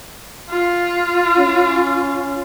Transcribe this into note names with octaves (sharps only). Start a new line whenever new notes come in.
F4
C#4